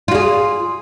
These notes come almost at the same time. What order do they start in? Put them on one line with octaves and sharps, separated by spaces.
F4 F#4 G#4